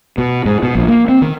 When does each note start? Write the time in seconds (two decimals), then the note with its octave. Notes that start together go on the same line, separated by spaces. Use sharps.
0.18 B2
0.46 G#2
0.63 B2
0.75 A#1
0.88 A#3
1.08 C4
1.22 D#3